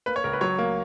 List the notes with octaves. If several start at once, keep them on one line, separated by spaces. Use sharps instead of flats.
A#3 B4
C#5
C#2 A#4
B4
F#3 C#5
A#3